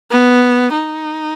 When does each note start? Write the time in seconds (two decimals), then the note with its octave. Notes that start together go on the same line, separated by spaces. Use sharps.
0.11 B3
0.73 D#4